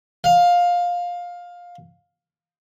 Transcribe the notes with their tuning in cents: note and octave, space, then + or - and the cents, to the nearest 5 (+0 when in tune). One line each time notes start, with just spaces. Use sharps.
F5 +15